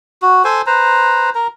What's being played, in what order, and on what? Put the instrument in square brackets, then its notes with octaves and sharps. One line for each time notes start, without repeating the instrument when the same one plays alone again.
[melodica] F#4
A4 C5 G#5
B4 C5 A#5
A#4 A#5